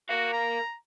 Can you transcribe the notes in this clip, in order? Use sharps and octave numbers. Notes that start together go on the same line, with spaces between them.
F#4 A#4 F5
A#5